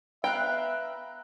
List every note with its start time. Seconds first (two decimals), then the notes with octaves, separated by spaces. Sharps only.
0.24 B3 E5 F5 G5 A#5 F#6